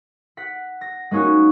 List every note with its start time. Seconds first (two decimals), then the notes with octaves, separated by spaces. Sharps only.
0.37 F#5 B6
0.81 A#6
1.11 G#3 A#3 C#4 D#4 F#4